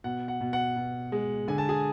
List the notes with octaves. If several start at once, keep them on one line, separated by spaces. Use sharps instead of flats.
B2 F#5
F#5
B2
F#5
B2
G#3
D3 G#5
A5
G#4 G#5